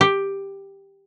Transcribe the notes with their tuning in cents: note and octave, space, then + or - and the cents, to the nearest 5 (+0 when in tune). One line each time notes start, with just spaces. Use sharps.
G4 +5